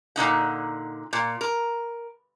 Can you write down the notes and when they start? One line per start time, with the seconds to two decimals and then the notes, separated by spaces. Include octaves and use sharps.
0.16 A#2 D3 D#4 F#5
1.13 A#2
1.41 A#4